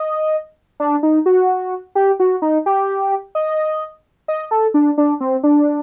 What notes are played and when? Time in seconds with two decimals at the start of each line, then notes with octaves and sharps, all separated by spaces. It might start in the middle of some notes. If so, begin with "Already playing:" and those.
Already playing: D#5
0.80 D4
1.03 D#4
1.26 F#4
1.95 G4
2.20 F#4
2.42 D#4
2.66 G4
3.35 D#5
4.28 D#5
4.51 A4
4.74 D4
4.98 D4
5.20 C4
5.43 D4